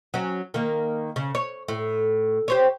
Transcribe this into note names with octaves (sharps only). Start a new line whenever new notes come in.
F#3 C#4
D#3 A#3
C#3
C#5
A2
G4 C5 C#5